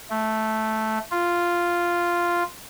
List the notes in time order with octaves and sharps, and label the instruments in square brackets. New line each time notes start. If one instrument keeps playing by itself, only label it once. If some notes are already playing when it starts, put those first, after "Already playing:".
[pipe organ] A3
F4